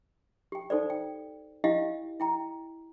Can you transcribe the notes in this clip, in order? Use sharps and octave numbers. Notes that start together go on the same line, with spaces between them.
G4 G5
D#4 A4 C5 D5
G5
E4 G4 D#5 F5 G5
E4 G5 A#5